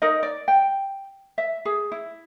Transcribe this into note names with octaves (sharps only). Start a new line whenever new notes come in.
D#4 A#4 D#5
D5
G5
E5
G#4
E4